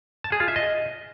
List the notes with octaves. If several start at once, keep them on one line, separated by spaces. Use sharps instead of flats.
A5
G#4
F4
E5
D#5